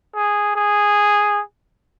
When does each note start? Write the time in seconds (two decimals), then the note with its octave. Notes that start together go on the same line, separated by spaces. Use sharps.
0.15 G#4
0.56 G#4